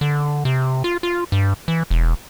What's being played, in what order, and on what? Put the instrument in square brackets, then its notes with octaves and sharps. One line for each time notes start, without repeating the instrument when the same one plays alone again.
[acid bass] D3
C3
F4
F4
G2
E3
E1